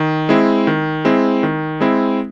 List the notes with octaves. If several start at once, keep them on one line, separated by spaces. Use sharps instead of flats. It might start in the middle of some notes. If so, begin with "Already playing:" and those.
Already playing: D#3
G#3 C4 E4
D#3
G#3 C4 E4
D#3
G#3 C4 E4